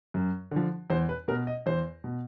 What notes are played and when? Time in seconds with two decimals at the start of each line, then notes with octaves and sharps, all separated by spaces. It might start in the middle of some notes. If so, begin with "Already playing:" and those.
0.14 F#2
0.51 D3 F3
0.90 E2 C5
1.09 B4
1.28 B2 A#4
1.47 D#5
1.66 E2 C5
2.04 B2